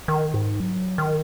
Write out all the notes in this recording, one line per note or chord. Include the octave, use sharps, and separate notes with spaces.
D#3
G#2
F#3
D#3